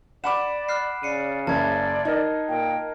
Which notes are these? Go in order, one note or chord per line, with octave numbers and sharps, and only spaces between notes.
D5 F#5 B5 D6 E7
F6 F#6 C7
C#3 D5 C7 C#7 D#7
F#1 D5 A5 G#6
D#4 A#4
A#2 G5